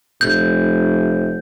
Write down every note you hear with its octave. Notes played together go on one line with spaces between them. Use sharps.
F1 G6